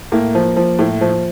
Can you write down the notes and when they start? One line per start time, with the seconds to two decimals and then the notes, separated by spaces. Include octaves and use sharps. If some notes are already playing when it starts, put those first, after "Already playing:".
0.12 A2 A#3
0.35 F3
0.57 F3
0.79 A2
1.01 F3